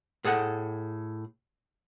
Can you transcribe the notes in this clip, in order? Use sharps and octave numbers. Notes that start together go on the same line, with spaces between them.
A2 G#4 A4 F#5